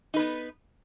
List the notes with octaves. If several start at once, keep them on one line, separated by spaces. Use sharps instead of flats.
B3 D#4 B4